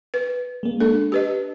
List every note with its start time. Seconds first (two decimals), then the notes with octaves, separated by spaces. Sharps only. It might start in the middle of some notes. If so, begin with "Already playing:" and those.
0.14 B4
0.63 G#3 A#3
0.80 D4 A4
1.12 G4 B4 D#5